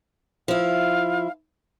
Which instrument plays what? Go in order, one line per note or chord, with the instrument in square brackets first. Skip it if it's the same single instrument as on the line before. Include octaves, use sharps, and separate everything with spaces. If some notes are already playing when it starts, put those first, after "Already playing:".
[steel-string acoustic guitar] F3 E4 [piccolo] F5